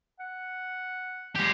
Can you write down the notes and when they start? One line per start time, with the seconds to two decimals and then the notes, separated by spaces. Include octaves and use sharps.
0.20 F#5
1.35 G#3 G4